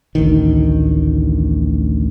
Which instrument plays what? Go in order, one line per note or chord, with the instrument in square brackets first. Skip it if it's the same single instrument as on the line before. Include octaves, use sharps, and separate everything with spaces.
[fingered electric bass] A1 D2 D#3